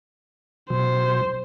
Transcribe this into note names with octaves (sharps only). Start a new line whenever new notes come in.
B2 F#3 C5